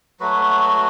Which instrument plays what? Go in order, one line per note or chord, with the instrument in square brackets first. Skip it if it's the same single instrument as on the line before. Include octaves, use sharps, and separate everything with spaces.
[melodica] F#3 A3 F#4 B4